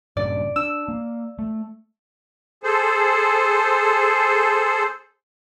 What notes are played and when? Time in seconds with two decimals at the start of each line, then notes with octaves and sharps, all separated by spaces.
0.17 G2 A#2 C#3 D5
0.56 D4 E6
0.88 A#3
1.39 A3
2.63 G#4 A4 C5